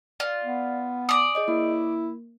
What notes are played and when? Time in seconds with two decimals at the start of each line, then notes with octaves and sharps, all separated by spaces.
0.20 F4 D5 F5
0.44 B3
1.09 D5 G#5 D6 D#6
1.35 G#4 C#5 D#5
1.48 A#3 E4